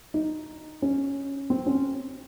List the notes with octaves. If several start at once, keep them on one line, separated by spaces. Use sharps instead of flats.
D#4
C#4
C4
C#4